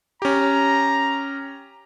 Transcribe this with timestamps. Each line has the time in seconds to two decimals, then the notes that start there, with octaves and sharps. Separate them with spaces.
0.22 C#4 G4 A#5